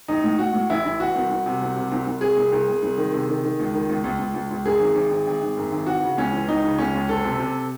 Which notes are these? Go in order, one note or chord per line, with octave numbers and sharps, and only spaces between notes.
A1 D#4
A2
A2 F#4
A2
A1 E4
A1
E3 F#4
C2
C2
C3
C2
C3
C2
C2
C3 G#4
C2
C2
C2
C2
D#3
C3
D#3
D#3
C#2
D#3
C#2
C#2
C#2
C#2
C#2
F#2 G#4
G#1
G#1
G#1
G#1
G#1
F#2
G#1
E3 F#4
C#3
C#2 C#4
E3
C#2 D#4
C#3
C#2 C#4
C#2
F#1 A4
C3
C3